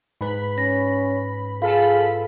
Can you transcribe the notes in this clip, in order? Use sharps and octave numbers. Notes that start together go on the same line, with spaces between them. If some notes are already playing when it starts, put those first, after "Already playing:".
G#2 B4 B5
C#4 A#6
F4 G#4 A4 F5 B5